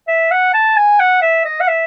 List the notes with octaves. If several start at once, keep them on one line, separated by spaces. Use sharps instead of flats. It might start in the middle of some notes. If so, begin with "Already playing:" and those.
E5
F#5
A5
G#5
F#5
E5
D#5
F#5
E5